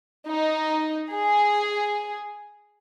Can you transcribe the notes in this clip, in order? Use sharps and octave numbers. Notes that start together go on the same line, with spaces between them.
D#4
G#4